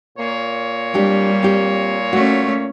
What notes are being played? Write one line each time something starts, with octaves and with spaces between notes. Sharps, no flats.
A#2 A#3 C#5
G3 C4 D4 G4
C4 G4
A3 C#4 F#4